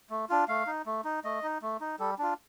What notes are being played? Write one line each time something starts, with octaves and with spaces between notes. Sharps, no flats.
A3
D4 F4
A3 F5
D#4
A3
D#4
A3 D#5
D#4
A3
D#4
G3 A4
D4 F4